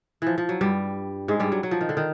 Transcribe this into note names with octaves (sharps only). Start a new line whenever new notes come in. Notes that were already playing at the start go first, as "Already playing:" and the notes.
E3 F3
F3
F#3
G2 G3
G#2 G#3
G2 G3
F#3
F#3
F3
D#3
D3
D#3